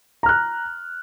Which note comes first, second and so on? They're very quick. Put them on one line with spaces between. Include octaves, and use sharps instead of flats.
A#5 F6 F#6